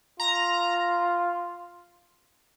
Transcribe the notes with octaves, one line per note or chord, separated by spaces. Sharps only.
F4 A#5